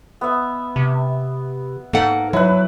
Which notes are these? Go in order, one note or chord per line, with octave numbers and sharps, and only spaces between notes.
B3 E5
C3
G#2 A#3 A4 F#5
F#3 E4 B4